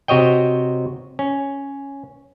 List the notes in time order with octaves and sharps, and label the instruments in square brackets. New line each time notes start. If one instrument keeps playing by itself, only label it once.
[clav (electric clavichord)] C3 F#4 C#5 D#5 G5
C#4